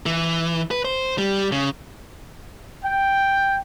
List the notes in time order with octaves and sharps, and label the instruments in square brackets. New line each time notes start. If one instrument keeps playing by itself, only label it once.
[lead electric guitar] E3
B4
C5
G3
C#3
[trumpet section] G5